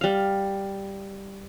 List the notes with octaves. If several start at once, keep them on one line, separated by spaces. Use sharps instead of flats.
G3 F5